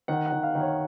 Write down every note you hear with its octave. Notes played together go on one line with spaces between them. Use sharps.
D#3 F#5
F#5
D#3
F5
D#3
C#5